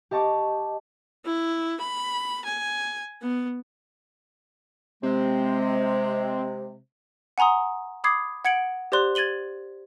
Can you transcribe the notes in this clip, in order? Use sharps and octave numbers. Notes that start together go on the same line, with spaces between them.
G4 D#5 A5 C#6 D6
E4
B5
G#5
B3
C3 G#3 C4
F#5 G#5 A#5 C6 D#6
B5 D6 D#6 G#6 C7
F#5 G#6 C#7 D7 F#7
G4 C5 D5 C6 F#6
G#6 A6 D#7 F#7 G7